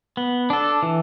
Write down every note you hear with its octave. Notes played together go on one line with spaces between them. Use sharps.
B3
D4 A4
E3